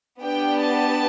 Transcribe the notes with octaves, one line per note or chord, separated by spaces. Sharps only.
B3 D4 G4 G5
A5